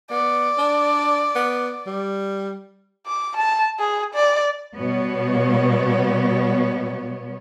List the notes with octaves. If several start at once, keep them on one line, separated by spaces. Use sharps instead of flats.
B3 D5
D4
B3
G3
D6
A5
G#4
D5
B2 G3 B3 C#5